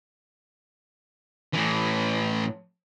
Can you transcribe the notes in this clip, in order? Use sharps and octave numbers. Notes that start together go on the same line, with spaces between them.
A2 E3